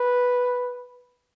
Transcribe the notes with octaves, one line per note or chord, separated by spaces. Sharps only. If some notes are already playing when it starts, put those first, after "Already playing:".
Already playing: B4